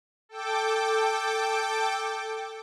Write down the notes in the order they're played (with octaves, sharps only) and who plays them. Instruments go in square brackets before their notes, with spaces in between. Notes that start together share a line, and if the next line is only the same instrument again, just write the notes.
[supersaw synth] A4 G5 D6